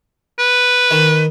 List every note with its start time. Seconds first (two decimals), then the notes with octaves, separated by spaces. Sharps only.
0.39 B4
0.91 D#3